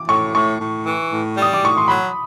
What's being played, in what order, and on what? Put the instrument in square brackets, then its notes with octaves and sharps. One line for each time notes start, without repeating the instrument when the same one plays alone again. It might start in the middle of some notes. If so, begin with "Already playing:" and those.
Already playing: [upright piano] D6
[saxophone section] A2 [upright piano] C#6
[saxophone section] A2 [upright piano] C#6
[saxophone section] A2
E3
A2
G3
[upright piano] D#6
D6
[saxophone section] A2 [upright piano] C#6
[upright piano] C6
[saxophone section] F#3 [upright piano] B5